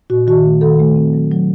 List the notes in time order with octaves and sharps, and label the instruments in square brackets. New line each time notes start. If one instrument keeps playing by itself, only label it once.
[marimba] A#2 F#4
D#3 F#4
A3
D#3 A4
A3
C4
F#3
F#3